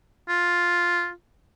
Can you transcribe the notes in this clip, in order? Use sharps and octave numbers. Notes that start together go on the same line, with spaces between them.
F4